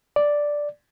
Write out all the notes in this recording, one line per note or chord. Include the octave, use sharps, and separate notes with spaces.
D5